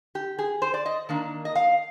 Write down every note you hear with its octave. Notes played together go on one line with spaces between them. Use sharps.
G4
G#4
C5
D5
D#5
D#3 A#3 D4
D#5
F5